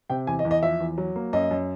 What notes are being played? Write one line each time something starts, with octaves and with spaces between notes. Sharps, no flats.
C3 G5
E2 G#5
D#5
E2
D#5
F3 E5
E2
F#3
A#3
F#2 D#5
F#2